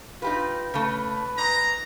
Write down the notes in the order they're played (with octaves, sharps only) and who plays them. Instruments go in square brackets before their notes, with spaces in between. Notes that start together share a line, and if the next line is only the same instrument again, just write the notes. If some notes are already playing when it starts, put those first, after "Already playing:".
[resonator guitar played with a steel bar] D#4 G4 B4 [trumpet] F4
[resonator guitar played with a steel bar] C#3 A3 [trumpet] B4
[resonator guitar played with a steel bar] G#2 [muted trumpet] A#5